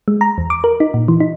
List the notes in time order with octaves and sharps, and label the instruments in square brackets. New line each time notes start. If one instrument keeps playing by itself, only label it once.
[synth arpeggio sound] G#3
A#5
E2
D6
A#4
D#4
A#2
E3
D#4